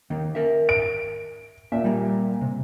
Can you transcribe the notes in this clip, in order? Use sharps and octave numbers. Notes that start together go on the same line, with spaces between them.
D#3 A#3
A#4 E5
D7
A#2 E5
G3 A#3
C3